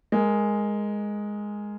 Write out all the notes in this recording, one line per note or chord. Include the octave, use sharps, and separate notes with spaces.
G#3 A#4